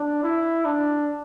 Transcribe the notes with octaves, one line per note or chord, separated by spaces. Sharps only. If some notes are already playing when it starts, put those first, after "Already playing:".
Already playing: D4
E4
D4